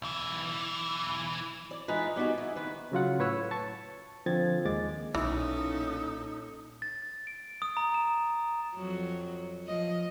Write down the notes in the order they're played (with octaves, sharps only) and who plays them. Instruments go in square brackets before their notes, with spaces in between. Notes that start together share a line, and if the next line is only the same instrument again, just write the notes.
[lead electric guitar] B1 E3
[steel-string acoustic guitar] D5
E3 G#3 D#4 F4 A#4 B4
G3 B3 D#4 F#4 G#4
E3 B3
D#3 A#3 B4
[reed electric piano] C#3 F#3 F4 F#5
A2 B4 C#5 E6
A5 C#6
D3 F3 C4 G#6 A6
D#2 G#3 D6 A6
[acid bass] B1 [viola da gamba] A#2 C#4 A4 [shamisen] E3 [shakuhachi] D#4
[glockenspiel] A6
D7
D#6
A#5
E7
[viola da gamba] F2 F#3
F3 D#5